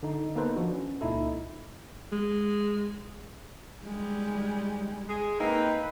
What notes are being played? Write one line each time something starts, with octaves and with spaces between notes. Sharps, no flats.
D3 D#4
A#3 B3 D#4 A4 B4 C5
E3 F3 D4 F#4
C#4
C#2 A#2 D#4 E4 A4
G#3
G3 G#3
G#3 G#4
A#3 C4 D#4 B4